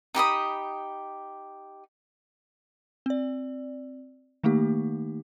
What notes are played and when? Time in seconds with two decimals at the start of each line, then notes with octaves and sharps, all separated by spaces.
0.15 D#4 G4 B5 D#6
3.06 C4 D5
4.44 D#3 A3 A#3 D#4 G4